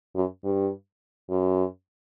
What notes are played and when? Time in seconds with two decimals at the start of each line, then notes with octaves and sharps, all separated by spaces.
0.15 F#2
0.44 G2
1.30 F#2